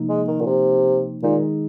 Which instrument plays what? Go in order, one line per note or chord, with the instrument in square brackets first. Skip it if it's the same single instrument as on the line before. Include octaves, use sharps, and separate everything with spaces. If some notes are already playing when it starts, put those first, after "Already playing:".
Already playing: [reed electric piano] C3 F3 A#3 D#4
[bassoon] G#3
D#3
A#2
C3
[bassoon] A#2 [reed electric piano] D#3 G#3 D#4 G#4